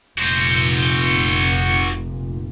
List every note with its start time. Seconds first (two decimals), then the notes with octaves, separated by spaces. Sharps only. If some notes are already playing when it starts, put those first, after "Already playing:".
0.18 F1 A#2 F#4 C5